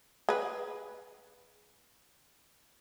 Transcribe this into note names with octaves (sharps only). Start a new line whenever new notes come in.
G#4 B4